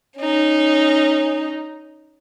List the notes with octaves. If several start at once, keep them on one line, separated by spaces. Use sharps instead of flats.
C#4 D#4